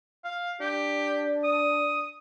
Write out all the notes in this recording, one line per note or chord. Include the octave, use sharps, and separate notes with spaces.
F5
D4 G4
D#6